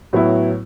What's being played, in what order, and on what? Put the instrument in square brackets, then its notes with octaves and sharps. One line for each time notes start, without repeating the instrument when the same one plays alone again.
[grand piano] A2 F#3 B3 E4